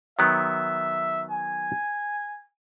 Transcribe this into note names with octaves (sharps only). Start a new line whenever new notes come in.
D#3 F#3 B3 E5
G#5